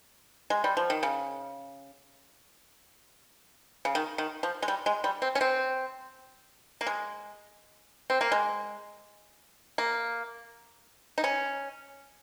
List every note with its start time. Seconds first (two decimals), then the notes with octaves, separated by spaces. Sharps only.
0.50 G#3
0.64 G3
0.77 F3
0.90 D#3
1.03 C#3
3.85 C#3
3.95 D#3
4.18 D#3
4.43 F3
4.62 G#3
4.68 G3
4.86 G#3
5.04 G3
5.22 C4
5.35 C#4
5.41 C4
6.81 A#3
6.87 G#3
8.10 C4
8.21 A#3
8.32 G#3
9.78 A#3
11.18 D#4
11.24 C#4